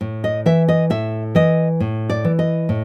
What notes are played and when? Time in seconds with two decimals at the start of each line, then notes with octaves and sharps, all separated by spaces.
0.01 A2
0.24 D#5
0.46 E3 E5
0.68 D#5
0.90 A2 E5
1.35 E3 D#5
1.80 A2
2.10 D5
2.25 E3
2.39 D#5
2.69 A2